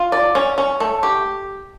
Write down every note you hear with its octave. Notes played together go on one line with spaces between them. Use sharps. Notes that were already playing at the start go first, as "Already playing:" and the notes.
Already playing: F4
D5
C#4
C#4
A3
G4